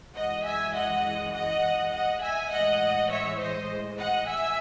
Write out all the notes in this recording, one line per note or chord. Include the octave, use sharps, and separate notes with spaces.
F#2 E3 G#3 D#5 F#5
E5 G#5
D#5 F#5
D#5 F#5
D#5 F#5
E5 G#5
A2 E3 G#3 D#5 F#5
C#5 E5
C5 D#5
D#5 F#5
E5 G#5